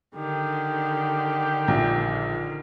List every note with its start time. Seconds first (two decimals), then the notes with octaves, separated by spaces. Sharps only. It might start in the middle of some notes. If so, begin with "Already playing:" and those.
0.14 D3 D#3 G4
1.68 A#1